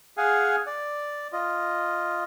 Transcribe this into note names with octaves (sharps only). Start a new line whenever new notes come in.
G#4 F5 F#5 G#5
D5
F4 D#5